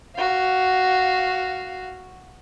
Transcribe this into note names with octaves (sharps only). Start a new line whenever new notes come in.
F#4 F5